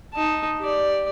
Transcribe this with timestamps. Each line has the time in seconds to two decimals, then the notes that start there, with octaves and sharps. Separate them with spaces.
0.14 D#4 A5
0.59 G4 D5